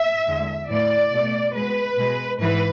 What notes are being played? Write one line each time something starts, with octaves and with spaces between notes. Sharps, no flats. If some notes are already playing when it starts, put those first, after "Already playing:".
Already playing: E5
E2 D3 G#3
A2 E3 A3 D5
B2 A3
B2 G#3 B4
B2 G#3
G#2 E3 B4